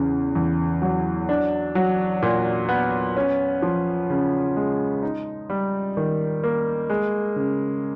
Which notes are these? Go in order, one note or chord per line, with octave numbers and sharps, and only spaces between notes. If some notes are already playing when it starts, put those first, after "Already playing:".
Already playing: E2 C#3
E2
F#3
D4
F#3
A#2
B3
C#4
F3
C#3
G#3
D#4
G3
D#3
A#3
G#3
C#3